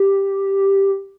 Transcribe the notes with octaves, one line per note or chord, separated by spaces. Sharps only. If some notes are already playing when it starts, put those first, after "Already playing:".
Already playing: G4